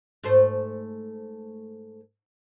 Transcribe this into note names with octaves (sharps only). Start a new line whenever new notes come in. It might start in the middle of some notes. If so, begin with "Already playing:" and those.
G#2 A3 C5